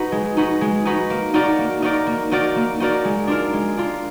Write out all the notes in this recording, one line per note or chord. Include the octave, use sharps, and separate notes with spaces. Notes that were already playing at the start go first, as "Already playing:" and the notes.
Already playing: D#4 F#4 B4
G#3
D#4 F#4 B4
G#3
D#4 F#4 B4
A#3
D#4 F#4 A#4 D5
A#3
D#4 F#4 A#4 D5
A#3
D#4 F#4 A#4 D5
A#3
D#4 F#4 A#4 D5
G#3
D4 F4 A#4
G#3
D4 F4 A#4